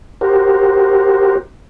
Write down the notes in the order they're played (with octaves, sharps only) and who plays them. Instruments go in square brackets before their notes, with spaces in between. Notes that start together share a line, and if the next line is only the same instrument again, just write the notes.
[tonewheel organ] F#4 G4 A#4 C5